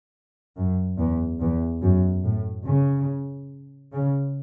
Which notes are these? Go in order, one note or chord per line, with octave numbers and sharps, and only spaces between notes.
F#2
E2
E2
F#2
A2
C#3
C#3